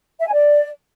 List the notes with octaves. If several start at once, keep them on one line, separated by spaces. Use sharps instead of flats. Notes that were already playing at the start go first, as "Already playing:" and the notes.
E5
G#5
D5